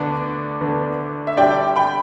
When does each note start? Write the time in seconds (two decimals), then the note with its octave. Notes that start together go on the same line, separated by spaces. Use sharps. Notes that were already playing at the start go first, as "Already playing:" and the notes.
Already playing: D2 D3 B3 D4 D5
0.61 D2 D3 B3 D4
1.27 E5
1.37 D2 D3 G3 D4 G4 D5 G5
1.76 G5 B5